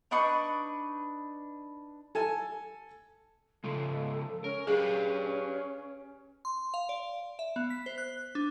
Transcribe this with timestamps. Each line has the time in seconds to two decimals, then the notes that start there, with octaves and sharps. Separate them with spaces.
0.11 D4 D#4 B4 C#6
2.15 A4 G#5 A5
3.64 C#3 F3 G#3 A4
4.44 C#4 A#4
4.67 C#4 G4 G#4 B4 F5
6.45 C6
6.74 F5
6.89 D5
7.39 E5
7.56 B3
7.70 B6
7.86 C5
7.98 F#6
8.35 D4